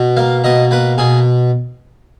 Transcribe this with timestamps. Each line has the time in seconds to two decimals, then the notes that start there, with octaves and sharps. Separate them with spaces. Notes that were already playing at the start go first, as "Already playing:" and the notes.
Already playing: B2
0.17 A#3 F5
0.44 B2 D#5
0.71 A#3 B4
0.98 B2 G#4